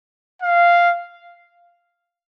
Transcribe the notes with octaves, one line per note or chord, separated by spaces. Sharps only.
F5